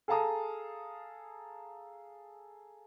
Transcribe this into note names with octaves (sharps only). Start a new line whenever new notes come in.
G#4 A4 F5 A5 A#5 D#6